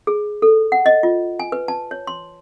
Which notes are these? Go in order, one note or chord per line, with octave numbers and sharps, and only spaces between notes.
G#4
A4
F#5
D#5
F4
G#5
B4
A5
C#5
C6